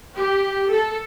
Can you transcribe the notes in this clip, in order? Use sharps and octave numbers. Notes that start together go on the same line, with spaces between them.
G4
A4